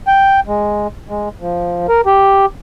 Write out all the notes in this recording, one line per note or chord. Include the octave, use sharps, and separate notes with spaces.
G5
G#3
G#3
F3
A#4
G4